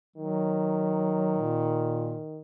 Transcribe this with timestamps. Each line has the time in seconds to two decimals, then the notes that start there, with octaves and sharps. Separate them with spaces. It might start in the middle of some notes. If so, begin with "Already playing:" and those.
0.16 D#3 F#3
1.37 A#2